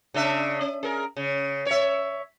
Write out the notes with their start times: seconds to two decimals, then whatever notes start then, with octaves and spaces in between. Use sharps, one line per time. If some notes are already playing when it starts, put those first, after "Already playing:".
0.14 C#3 D4 E5
0.61 C#4
0.83 G#4 A#4
1.16 C#3
1.66 C#5 E5